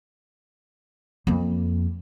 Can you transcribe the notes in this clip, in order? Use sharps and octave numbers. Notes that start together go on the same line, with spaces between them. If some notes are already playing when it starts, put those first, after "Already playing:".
F2 A#3